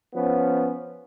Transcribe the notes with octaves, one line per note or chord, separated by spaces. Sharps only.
F3 B3 C#4